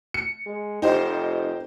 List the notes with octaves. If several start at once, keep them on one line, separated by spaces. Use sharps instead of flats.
C#7
G#3
F1 D#4 G4 C5